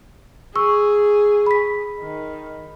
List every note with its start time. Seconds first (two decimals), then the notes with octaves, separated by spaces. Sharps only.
0.56 G#4 C#6 E6
1.46 B5 B6
2.00 D#3